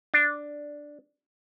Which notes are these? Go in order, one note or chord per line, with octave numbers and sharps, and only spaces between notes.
D4